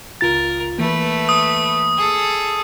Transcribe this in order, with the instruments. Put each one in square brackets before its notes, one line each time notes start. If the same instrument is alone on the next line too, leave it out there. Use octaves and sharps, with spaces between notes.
[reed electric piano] C#2 F4 A6 [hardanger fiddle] A#4
[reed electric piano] E3 A#3 [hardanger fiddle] A3 B4
[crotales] D#6
[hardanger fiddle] G#4 A4